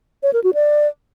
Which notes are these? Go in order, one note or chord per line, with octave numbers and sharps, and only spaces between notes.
C#5
A#4
F#4
D5